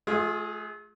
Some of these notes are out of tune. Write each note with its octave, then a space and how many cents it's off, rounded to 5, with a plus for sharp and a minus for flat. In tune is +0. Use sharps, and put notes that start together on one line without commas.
A3 -40 F4 +25 G#4 +0